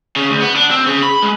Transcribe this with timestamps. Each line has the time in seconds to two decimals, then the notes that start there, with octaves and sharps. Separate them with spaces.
0.16 C#3
0.30 D2
0.41 B3
0.56 D4
0.71 C4
0.86 C#3
1.03 B5
1.22 G#3